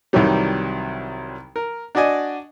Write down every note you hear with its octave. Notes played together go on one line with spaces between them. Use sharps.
C2 D#3 E3 F#3 G3
A#4
D4 F#4 D5 D#5 G#5